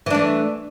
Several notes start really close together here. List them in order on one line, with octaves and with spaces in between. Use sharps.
E3 D4 A3